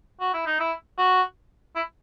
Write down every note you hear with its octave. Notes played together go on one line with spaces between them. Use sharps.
F#4
E4
D#4
E4
F#4
E4